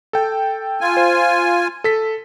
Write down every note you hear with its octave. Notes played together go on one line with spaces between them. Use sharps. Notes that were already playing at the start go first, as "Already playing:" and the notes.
A4 G5
F4 G#5
C5
A4 B6